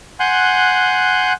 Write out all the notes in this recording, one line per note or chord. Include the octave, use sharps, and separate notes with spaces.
F#5 G#5 C6 F#6 G6